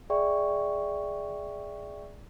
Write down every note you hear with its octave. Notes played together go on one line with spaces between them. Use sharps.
G#4 D5 E5 G5 C#6